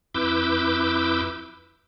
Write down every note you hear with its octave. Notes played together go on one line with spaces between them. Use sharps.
F2 E4 B4 D6 E6 G6